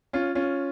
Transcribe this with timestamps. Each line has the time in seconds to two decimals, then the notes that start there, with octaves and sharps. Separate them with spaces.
0.13 C#4 F4
0.35 C#4 F4